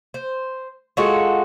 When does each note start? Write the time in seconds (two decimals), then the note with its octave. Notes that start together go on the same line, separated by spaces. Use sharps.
0.14 C5
0.97 G#3 F4 F#4 A4